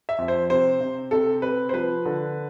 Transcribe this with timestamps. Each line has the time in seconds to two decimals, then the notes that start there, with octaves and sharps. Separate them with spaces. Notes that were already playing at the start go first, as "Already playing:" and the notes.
0.09 E5
0.18 F2
0.28 C5
0.50 C3 C5
0.80 C3
1.11 C3 A4
1.42 C3 B4
1.69 C5
1.73 F3 B4
2.05 D3